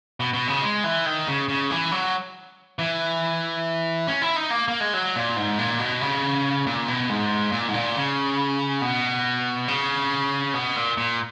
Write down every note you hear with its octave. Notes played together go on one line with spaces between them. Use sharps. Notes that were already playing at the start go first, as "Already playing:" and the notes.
B2
B2
C#3
G#3
E3
D#3
C#3
C#3
E3
F#3
E3
C#4
E4
D#4
A#3
A#3
G#3
F#3
A#2
G#2
A#2
B2
C#3
A#2
B2
G#2
A#2
G#2
A#2
C#3
B2
C#3
B2
A#2
A#2